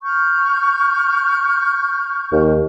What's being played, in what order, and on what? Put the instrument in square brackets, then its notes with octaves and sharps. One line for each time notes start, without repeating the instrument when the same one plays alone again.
[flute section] C#6 F6 G6
[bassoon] D#2